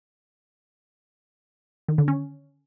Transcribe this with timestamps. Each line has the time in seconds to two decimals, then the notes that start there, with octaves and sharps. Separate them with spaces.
1.88 D#3
1.98 D3
2.08 C#4